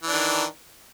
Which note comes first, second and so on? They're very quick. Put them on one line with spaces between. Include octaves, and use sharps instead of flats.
E3 D4 D#3